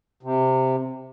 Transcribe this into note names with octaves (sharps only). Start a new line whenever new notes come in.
C3